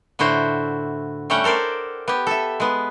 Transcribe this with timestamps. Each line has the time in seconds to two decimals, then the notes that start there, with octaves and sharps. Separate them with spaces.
0.19 A2 D3 E4 F#4 C5
1.30 G3 A3 C#4 F#5 G5
1.44 A4 A#4 C5 D5
2.08 B3 G4
2.27 A4 E5
2.60 G#3 B3